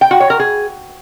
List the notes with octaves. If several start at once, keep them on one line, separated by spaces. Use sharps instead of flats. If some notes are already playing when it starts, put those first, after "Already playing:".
G5
F#4
C#5
A#4
G#4